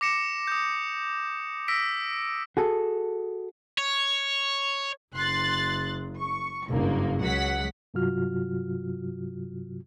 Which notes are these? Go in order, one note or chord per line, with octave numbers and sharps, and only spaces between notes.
D6 A#6 C#7 E7
D#6 G6
E6 A#6 B6 D7
F#4 G#4 A4
C#5
F#1 C6 F#6 A6
C#6
F#1 G2 A#3
C#2 F#3 G#3 F#5 B6
G2 C3 F#3 F4 F#4 F6